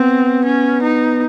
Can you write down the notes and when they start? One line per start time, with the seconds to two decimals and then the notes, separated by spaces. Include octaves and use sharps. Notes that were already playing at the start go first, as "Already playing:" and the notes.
Already playing: B3 C4
0.45 C#4
0.83 D#4